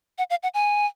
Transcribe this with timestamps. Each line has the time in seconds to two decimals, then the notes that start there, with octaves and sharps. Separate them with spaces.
0.18 F#5
0.30 F5
0.43 F#5
0.54 G#5